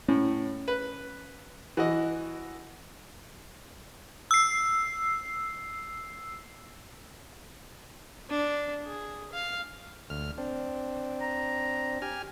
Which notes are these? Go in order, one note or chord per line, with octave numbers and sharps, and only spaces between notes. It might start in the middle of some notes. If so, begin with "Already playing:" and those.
A2 C#4
B4
E3 F#4 D#5
E6 C7
D4
G#4
F5
D2 F6
C4 D4
A#5
G4 G#5 F6